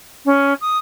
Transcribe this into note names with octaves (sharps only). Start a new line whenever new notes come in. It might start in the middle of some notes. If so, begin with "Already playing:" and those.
C#4
D#6